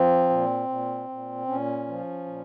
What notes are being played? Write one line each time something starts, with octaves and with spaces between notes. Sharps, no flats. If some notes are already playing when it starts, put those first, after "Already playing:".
Already playing: F3 C4
A#2
A#2
A#2
A#2 C#4
F3
A#2